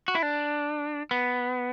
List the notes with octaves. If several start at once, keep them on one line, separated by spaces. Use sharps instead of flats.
F#4
E4
D4
B3